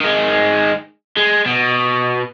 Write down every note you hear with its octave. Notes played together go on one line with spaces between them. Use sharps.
D#3 G#3
G#3
B2